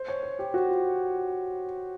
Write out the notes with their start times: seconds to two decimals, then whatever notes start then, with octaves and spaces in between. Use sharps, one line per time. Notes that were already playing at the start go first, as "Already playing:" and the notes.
Already playing: C5
0.08 C#5
0.23 C5
0.39 G4
0.54 F#4
0.69 F4